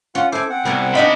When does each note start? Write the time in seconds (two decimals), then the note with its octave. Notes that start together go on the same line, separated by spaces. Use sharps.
0.15 C#4 F4 F#5
0.32 E4 A4 C5 G#5 D6
0.50 C4 F#5
0.65 C2 B3 A#4 G#5
0.95 C3 D4 D#4 F4 D#5 B5